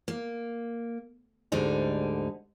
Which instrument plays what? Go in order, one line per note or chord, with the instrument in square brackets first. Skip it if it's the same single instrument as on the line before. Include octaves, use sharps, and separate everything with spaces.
[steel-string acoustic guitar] A#3
D2 G#2 D3 G3 D#4